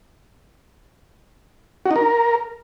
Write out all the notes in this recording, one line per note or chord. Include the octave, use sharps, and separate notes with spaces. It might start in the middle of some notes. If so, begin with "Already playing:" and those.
F#4
D#4
A#4